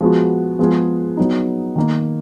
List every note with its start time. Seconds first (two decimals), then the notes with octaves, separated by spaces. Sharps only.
0.01 F3 G#3 B3 F#4
0.59 F3 G#3 B3 F4 G#4
1.17 F#3 B3 D#4
1.76 D#3 A#3 D#4